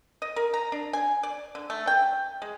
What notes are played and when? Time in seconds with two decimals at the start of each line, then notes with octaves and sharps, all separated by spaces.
0.22 D#5
0.36 A#4
0.54 A#5
0.72 D4
0.93 G#5
1.23 D5
1.55 D3
1.70 A3
1.87 G5
2.42 G#3